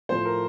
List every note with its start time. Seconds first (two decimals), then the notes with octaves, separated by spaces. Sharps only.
0.09 A2 F3 C5
0.25 A#4